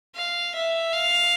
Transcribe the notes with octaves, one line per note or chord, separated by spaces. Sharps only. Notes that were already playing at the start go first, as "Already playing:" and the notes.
F5
E5
F5